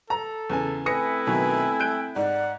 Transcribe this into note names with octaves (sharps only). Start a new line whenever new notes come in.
A4 A#5
E2 C#3 G#5
A3 C4 E4 B4 G#5 D#6 A#6 C#7
B2 D#3 F#3 G#5
F#6 G6 D7
G#2 D5 F#5